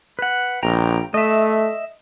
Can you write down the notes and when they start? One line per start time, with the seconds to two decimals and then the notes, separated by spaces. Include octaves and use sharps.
0.19 B4 F#5
0.63 A#1 G5 A#5
1.14 A3 D#5 E5